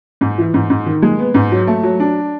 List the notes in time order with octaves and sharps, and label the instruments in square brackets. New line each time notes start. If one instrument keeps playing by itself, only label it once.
[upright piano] G#2
E3
G#2
G#2
D#3
G#3
B3
G#2
F#3
A3
F#3
D4